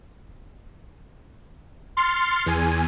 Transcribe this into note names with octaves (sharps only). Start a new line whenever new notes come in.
C6 F6 A6 C7 C#7
E2 G#5